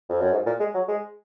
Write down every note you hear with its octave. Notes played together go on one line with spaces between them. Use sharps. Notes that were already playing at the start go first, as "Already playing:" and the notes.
F2
F#2
G#2
A#2
G#3
F#3
G#3